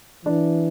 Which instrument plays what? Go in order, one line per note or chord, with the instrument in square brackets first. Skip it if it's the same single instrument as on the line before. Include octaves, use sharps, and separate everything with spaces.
[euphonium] E3 [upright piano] D4